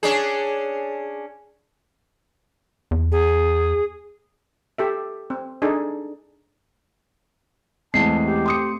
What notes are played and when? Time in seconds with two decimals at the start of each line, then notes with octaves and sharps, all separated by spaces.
0.03 C#4 D4 G#4
2.91 E2
3.12 G#4
4.78 G4 A4 E5
5.30 C4
5.62 D4 D#4 G#4 A4
7.94 E2 G#3 A3 C4 A5 C7
8.25 G4
8.46 C6 D#6 C#7